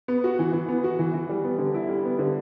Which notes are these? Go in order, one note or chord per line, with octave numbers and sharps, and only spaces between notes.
B3
F#4
E3
E3
B3
F#4
E3
E3
G3
B3
D3
E4
G3
B3
D3